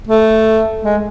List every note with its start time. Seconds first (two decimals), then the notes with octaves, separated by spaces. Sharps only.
0.07 A3
0.83 G#3